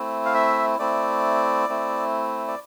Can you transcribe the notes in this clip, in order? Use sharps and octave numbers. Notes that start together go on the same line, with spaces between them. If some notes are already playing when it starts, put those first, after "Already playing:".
Already playing: A3 C4 E4
F5
E5
A3 C4 E4 D5
A3 C4 E4
D5